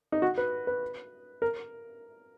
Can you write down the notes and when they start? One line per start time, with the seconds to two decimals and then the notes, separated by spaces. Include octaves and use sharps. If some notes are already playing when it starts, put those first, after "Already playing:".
0.12 D#4
0.22 F#4
0.38 B4
0.67 B4
1.42 A#4